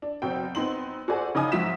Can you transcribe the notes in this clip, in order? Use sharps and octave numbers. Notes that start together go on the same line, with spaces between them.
D4
F#1 B2 C4 G5
B3 C4 D#4 C6 F#7
F#4 G#4 A4 C5 D5 G#5
C#3 D#4 D#5 G#5 D#6
G#2 F3 F#4 E5 B6 E7